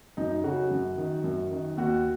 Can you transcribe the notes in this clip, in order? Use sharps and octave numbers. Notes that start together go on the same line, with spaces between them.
F#2 D#4
C#3 F#4
F#2
D#3
F#2
D#3
D#2 F#4